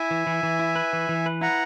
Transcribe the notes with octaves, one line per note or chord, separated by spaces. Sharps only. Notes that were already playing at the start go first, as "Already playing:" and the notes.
Already playing: E4 E5 G#5
E3
E3
E3
E4
B4
E3
E3
B4
E4 F#5 A#5